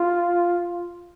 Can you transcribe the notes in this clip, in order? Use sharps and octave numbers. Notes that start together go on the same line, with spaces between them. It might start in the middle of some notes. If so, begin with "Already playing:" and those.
Already playing: F4